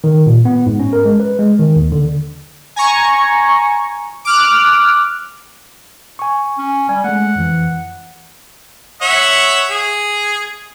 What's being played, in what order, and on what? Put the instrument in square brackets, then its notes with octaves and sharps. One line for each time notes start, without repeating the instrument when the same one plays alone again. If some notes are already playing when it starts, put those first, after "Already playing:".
[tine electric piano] D#3
A#2
B3
G#2
C#4
A#4
G#3
B4
G#3
D#3
D#2
D3
[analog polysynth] G#5 A#5 C#6
D6 F6 F#6
[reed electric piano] G#5 C#6
[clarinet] C#4
[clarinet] G3 [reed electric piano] G#5
[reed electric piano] G#3 A3 [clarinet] F#5
[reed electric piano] F2 E3
[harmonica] C#5 E5 F#5
G#4